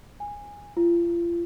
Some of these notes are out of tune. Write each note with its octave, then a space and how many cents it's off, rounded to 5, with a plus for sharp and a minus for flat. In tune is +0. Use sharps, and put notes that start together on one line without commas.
G#5 -15
F4 -35